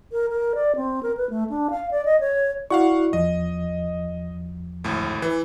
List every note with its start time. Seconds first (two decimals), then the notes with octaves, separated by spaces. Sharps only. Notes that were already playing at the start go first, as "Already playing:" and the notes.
0.12 A#4
0.30 A#4
0.55 D5
0.76 C4
1.03 A#4
1.17 B4
1.30 A3
1.50 D4
1.70 F5
1.91 D5
2.05 D#5
2.20 C#5
2.70 E4 F#4 D5 F5 F#5 C#6
3.13 E2 F3 D#5
4.84 G#1 D2 A2
5.22 E3